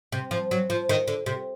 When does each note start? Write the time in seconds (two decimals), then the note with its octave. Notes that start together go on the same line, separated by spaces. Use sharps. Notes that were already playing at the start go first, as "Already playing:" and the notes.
0.12 C3
0.31 F3
0.51 F#3
0.70 F3
0.89 D#3
1.08 D3
1.26 C3